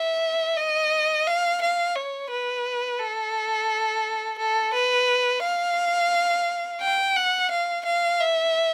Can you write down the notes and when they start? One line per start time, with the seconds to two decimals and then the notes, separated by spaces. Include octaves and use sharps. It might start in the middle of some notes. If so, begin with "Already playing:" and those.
Already playing: E5
0.57 D#5
1.27 F5
1.62 F5
1.95 C#5
2.30 B4
3.00 A4
4.38 A4
4.74 B4
5.43 F5
6.81 G5
7.16 F#5
7.51 F5
7.85 F5
8.20 E5